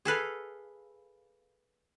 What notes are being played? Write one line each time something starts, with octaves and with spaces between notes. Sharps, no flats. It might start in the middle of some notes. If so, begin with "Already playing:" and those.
G#4 A4 B4 F5